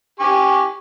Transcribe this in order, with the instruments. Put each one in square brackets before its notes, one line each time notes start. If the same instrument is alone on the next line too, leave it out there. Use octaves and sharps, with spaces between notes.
[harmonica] G4 G#5 C#6